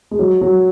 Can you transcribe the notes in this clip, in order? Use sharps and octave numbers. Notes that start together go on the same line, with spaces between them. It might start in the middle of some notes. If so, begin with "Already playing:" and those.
G#3
F#3
F#3